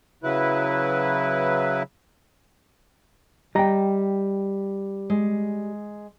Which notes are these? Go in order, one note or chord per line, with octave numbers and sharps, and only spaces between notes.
C#3 F#3 E4 B4
G3 D#5 G5 A#5
G#3